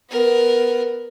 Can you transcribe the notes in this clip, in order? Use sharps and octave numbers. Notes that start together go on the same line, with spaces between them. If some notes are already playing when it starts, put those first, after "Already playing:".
B3 A#4